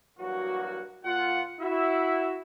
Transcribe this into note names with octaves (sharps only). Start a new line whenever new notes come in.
G2 E3 F#3 A#3 F#4
A#2 F4 F#5
E4 F#4 E5